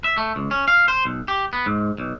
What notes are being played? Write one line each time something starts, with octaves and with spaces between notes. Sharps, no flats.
E5
A3
C#2
C#4
F5
C5
B1
G4
B3
G#2
B1